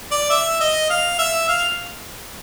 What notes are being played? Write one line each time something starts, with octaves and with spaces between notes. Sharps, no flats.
D5
E5
D#5
F5
E5
F5